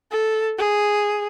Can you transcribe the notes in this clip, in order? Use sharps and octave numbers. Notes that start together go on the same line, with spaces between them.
A4
G#4